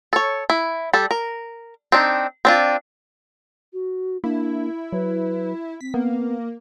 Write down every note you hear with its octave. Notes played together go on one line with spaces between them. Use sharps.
A4 C#5
E4
G3 A4
A#4
C4 D4 D#4
C4 D4 F4
F#4
A#3 D4 E4
F#3 B4
C4 B6
A#3 B3